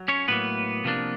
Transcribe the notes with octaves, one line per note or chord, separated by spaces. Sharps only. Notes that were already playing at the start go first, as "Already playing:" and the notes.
Already playing: F#3
C#4 C#5
A2 F#3 A#3 B3 B4
C3 F3 A#3 D4